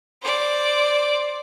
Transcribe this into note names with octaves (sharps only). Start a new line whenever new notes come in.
C5 D5